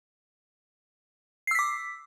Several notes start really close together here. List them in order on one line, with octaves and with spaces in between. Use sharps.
C7 E6 B6 D6